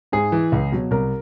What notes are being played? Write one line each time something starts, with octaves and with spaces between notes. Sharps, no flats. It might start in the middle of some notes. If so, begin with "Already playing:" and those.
G#2 G#4
E3
C#2
B2 F#3
C2 A#4